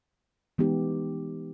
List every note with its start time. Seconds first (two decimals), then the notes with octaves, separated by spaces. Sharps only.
0.58 E3 G#3 B3 D#4 G4